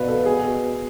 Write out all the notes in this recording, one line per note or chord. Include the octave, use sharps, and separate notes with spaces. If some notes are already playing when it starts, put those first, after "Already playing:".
Already playing: B2 B4 D5 F5
A4
G#4